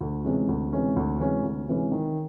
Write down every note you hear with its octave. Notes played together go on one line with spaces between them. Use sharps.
D2
C3 E3 G#3 C#4
D2
C3 E3 G#3 C#4
D2
C3 E3 G#3 C#4
D2
C3 E3 G#3 C#4
D#3